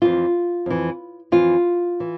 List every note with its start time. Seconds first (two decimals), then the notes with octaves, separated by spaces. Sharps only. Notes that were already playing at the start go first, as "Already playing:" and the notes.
0.02 F2 E3 F4
0.66 F2 E3
1.32 F2 E3 F4
2.00 E3